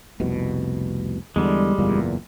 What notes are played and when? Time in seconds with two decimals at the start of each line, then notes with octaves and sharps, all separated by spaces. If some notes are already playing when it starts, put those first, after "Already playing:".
0.20 F1 C2 B2
1.36 E2 D3 G3 G#3
1.78 F#1 E2 A#2